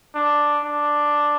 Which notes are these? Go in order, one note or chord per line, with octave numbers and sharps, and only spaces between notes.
D4
D4